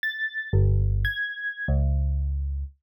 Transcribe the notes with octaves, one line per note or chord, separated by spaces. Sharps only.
A6
G1
G#6
C#2